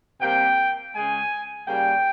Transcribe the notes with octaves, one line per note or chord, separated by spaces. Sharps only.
C3 G3 A#3 G5
C#3 G#3 G#5
C#3 G3 A#3 G5